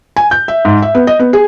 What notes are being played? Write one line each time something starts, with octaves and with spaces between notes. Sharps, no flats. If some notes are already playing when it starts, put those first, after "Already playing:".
G#5
G6
E5
G#2
E5
B3
D#5
B3
G#4